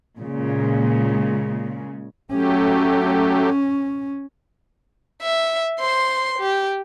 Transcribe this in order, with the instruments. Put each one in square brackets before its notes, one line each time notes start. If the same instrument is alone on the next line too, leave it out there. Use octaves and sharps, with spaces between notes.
[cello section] A#2 C#3 G#3
[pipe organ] F#3 A3 G4 [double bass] C#4
[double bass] C#4
[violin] E5
C5 C6
G4